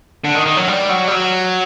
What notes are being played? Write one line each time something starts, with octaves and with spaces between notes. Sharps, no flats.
D3
D#3
D#3
F#3
G3
F#3
G3
F#3